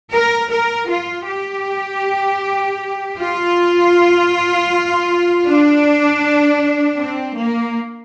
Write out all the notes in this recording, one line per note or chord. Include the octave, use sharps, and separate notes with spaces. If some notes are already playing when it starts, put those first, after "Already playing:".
A#4
A#4
F4
G4
F4
D4
C4
A#3